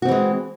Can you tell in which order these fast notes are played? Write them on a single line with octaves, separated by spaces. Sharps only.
F#4 C4 E3 G#3